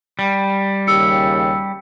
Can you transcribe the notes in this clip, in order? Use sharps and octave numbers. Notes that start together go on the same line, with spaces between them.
G3
D#2 C#3 G4 E6 C#7